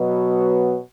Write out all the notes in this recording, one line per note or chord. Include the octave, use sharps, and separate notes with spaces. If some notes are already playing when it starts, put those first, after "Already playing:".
Already playing: B2 F#3 B3